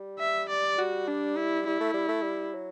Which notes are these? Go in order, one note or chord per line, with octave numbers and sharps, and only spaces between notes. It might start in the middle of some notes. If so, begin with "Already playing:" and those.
Already playing: G3
E5
D5
G3 F#4
D4
E4
G3 E4
A3
G3
A3
G3
F#3